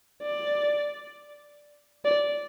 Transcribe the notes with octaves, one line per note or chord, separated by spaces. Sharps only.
D5
D5